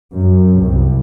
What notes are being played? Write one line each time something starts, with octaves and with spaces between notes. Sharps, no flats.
F#2
C2